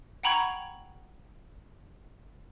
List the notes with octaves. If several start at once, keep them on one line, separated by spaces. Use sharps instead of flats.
F#5 G5 A#5 B5 C#6 G#6